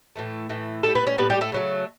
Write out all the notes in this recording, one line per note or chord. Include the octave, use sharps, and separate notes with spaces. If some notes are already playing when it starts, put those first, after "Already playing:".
A2 E3 A3
A2 E3 A3
A2 G3 A3 A4
B3 B4
C#4 C#5
A2 G3 B3 B4
G3 G4
A3 A4
C#3 F#3 A3